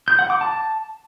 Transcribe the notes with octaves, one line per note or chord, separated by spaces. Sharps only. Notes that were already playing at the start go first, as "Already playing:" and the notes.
G6
F#5
D6
A5